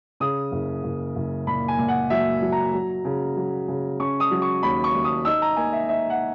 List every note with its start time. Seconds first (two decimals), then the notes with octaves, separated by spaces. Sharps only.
0.20 C#3 D#6
0.52 F#1
0.84 F#1
1.16 F#1
1.47 A#2 B5
1.68 G#5
1.78 A#2
1.88 F#5
2.10 F#3 E5
2.42 F#3
2.52 A#5
2.73 F#3
3.05 C#3
3.36 F#3
3.68 C#3
4.00 C#4 C#6
4.20 D#6
4.31 F#3
4.42 C#6
4.63 D#2 B5
4.84 C#6
4.95 D#2
5.04 D#6
5.25 D#4 E6
5.42 A#5
5.57 A#3 G#5
5.73 E5
5.89 D#4 E5
6.10 F#5